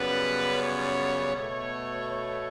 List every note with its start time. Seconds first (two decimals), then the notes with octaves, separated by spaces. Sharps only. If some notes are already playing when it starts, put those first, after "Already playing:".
Already playing: F#2 C#3 G3 B3 B4
0.61 C#5
1.35 B2 A3 C#5
2.11 C#5